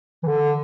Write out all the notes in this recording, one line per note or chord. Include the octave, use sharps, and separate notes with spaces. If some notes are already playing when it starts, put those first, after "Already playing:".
E3
D3